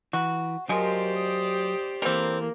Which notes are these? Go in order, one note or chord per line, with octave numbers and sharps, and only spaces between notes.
E3 F#4 B4
F3 F#3 G#3 G4 A#4 C5 D5
D#6
E3 G3 A#3 C4 A4 A#4